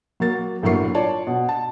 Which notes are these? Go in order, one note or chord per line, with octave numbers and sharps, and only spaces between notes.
F#3 A#3 A6
G1 A2 F#3 A#3 C#6 C7
F4 C#5 D5 A5
B2
A5